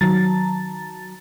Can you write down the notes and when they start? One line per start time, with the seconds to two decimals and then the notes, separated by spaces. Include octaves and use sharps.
0.01 D#3 F#3 A5 A#5 A6